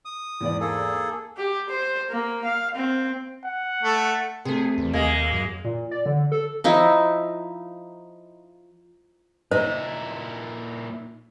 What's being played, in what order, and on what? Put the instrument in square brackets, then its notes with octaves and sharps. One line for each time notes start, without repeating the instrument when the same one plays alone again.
[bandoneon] D#6
[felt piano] E2 G#2 D5
[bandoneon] A#3 G#4 A4
[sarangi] G4
C5
A#3
F5
C4
[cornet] F#5
[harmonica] A3
[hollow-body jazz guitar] C3 A3 [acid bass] G#4
[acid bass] E2
[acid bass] D#2 [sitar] G#3 A#3
[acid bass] F#2
[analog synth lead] A#2
D5
D3
A4
[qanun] F3 D#4 E4
[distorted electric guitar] A#2 E4 [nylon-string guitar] D#4 [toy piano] C5